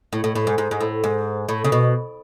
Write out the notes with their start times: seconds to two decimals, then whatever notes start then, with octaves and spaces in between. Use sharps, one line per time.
0.13 A2
0.24 A2
0.35 A2
0.47 G#2
0.58 G#2
0.71 G#2
0.81 A2
1.04 G#2
1.49 A2
1.64 C#3
1.72 B2